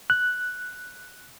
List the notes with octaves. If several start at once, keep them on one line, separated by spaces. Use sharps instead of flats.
F#6